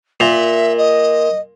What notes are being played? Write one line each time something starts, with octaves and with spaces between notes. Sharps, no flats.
A#2 E5
D#5